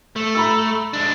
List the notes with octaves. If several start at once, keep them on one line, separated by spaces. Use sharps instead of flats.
A3
A#5 B5 E6
G#3 D4